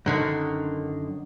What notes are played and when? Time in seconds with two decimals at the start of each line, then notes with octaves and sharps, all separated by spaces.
0.06 F#2 D3 D#3